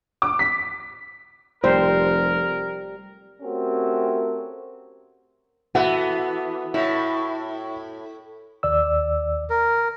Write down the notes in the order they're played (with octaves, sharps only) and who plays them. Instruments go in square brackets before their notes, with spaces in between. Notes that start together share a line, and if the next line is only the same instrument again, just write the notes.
[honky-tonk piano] D6
B6
[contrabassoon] F1 [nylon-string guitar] G3 [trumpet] A#4 [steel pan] C5
[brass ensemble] A3 C4 C#4 F#4 G4 A#4
[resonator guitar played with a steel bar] E3 [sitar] B3 [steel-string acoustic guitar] F#4 A4 E5 [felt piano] F#5
[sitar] A2 [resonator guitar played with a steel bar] E4
[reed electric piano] D#2 D5 E6
[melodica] A#4